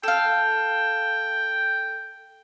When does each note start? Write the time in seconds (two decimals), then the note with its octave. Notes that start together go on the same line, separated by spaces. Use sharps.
0.03 A4 F5 G5